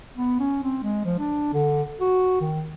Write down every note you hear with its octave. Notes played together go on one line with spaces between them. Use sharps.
B3
C#4
C4
G#3
F3
D4
D3
F#4
D#3